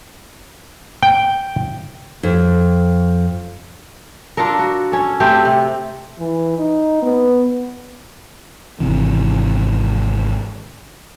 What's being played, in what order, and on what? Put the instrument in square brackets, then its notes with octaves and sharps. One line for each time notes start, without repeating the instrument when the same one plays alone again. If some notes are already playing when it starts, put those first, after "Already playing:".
[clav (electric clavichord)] G5
[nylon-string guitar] F2
[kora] D4 F4 A4 A#4
F#4
C#4 A4
A3 C4 G4
C3
[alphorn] E3
D#4
B3
[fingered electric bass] G#1 C3 E3